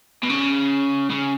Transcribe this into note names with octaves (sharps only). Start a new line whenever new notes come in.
B2
C#3
C#3